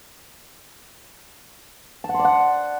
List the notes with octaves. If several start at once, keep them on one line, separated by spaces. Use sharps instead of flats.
A5
F#5
C6
D5
F#5